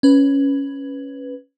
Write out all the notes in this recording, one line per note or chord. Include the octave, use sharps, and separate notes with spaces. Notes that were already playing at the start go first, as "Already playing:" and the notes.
C#4 B4